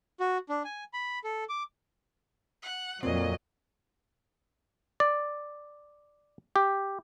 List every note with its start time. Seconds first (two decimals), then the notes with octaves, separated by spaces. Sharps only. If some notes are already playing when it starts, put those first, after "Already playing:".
0.20 F#4
0.49 D4
0.65 G#5
0.93 B5
1.24 A4
1.49 D6
2.63 F#5
3.03 F2 A#2 F#3 C4 D#5
5.00 D5
6.56 G4